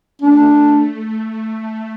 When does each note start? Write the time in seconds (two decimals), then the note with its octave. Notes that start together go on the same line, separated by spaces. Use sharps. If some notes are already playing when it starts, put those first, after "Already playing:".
0.22 A3 D4